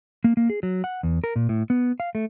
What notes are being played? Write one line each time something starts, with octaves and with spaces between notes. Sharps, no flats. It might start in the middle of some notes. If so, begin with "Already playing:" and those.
A#3
A#3
G#4
F#3
F#5
E2
A#4
A#2
A2
B3
F5
A3